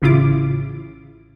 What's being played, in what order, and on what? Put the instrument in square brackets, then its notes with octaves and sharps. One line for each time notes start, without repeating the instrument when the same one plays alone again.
[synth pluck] A1 C#3 E4 F4 D6